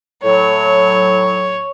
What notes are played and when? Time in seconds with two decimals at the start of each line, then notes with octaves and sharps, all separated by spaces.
0.24 A2 F#3 C#5